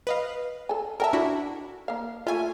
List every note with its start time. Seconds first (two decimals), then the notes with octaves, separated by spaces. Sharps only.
0.07 B4 D#5 F5
0.69 A4 G#5
1.00 A4 A#4 E5 G5 A5
1.13 D4 E4 F#4
1.88 A#3 F5
2.27 A3 F4 E5 G#5